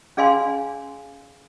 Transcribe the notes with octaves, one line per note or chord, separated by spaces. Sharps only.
C#4 G#4 D5 F5 G#5 C6